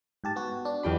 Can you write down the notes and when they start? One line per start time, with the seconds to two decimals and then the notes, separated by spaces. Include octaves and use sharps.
0.24 G#2 G4 A5
0.36 B3 F#4
0.65 D4
0.83 E2 G4 B5